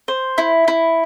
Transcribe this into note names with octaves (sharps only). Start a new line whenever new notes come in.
C5
E4
E4